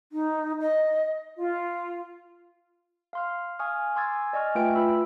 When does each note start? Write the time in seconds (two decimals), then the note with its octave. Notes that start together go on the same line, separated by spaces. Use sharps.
0.12 D#4
0.60 D#5
1.38 F4
3.13 F5 C6 F6
3.59 F5 G#5 C#6 D#6 F6
3.96 G#5 C6 D6 E6 G#6 A6
4.33 D5 D#5 G#5 C#6 F6
4.55 A3 F4 B4 E5 G5 D7
4.75 F4 B4 B5 E6